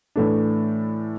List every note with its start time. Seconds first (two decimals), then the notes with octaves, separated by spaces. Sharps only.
0.16 A2 E3 A3 D4